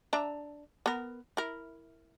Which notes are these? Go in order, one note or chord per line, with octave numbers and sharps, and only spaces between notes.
D4 E5 A#5
B3 A#4
E4 A#4